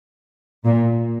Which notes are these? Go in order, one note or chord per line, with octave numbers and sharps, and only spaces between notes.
A#2